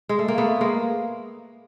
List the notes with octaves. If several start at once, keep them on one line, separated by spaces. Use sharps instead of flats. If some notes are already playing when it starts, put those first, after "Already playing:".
G#3
A3
A#3
A3 B3
G#3 A#3